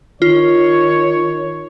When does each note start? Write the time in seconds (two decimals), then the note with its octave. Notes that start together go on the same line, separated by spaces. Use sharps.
0.22 D#3 F4 C#5